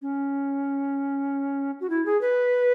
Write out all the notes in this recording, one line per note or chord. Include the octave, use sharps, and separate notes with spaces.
C#4
F#4
E4
G#4
B4